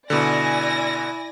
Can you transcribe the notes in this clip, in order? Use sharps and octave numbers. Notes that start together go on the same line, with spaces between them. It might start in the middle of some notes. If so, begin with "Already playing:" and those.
B2 D3 E4 D5 G#5 A#6